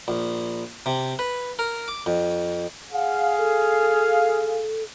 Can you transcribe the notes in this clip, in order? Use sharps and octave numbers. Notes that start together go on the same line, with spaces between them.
A#1
C3
B4
A#4
D6
F2
G#4 F5 F#5
A4